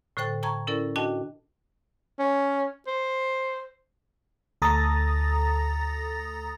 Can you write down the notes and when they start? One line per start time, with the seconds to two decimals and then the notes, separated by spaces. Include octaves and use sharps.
0.17 A2 D3 A4 C5 G5 A6
0.43 G5 A5 A#5 C#6 G#6
0.67 C#4 E4 A4 A#4 D5
0.96 D4 F#4 D#5 G5 A5
2.19 C#4
2.87 C5
4.62 D2 A4 A#5 D#6 A6 A#6